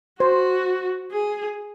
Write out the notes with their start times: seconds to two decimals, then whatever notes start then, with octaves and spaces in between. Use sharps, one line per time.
0.20 F#4 C5
1.12 G#4